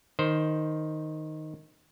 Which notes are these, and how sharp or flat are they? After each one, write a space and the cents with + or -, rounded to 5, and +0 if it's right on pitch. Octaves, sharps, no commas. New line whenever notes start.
D#3 +0 C5 +0